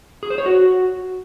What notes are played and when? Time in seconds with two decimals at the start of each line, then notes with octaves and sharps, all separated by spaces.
0.23 G#4
0.30 C5
0.38 C#5
0.46 F#4